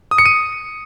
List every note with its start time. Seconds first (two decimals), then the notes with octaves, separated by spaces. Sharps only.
0.11 D#6
0.18 C#7
0.26 D#7